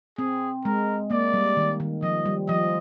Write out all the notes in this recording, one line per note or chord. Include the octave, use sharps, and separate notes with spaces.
C4 G#4
G#3 A#4
A#3 D5
G3
D#3
D#3
F3 D#5
G3
F3 D#5